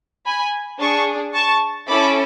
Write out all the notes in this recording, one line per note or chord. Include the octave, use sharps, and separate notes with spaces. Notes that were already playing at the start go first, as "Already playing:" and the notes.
G#5 B5
D4 G#4 A5 C#6
A5 C#6
C#4 E4 A4 B5 D6